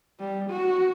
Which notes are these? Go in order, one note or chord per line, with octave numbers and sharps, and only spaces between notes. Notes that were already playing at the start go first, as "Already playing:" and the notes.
G3
F#4